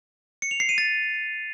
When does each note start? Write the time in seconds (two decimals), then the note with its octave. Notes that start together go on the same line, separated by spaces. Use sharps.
0.42 C#7
0.51 F7
0.60 C7
0.69 D#7
0.78 A6